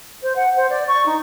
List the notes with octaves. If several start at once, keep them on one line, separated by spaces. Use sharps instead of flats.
C5
F#5
C5
D5
C#6
D#4